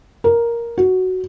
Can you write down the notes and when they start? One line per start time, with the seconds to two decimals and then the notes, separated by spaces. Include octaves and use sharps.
0.24 A#4
0.78 F#4